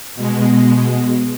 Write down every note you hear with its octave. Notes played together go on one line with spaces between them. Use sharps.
B2 G#3